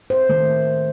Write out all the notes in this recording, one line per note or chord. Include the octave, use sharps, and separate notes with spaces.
C5
D#3 A3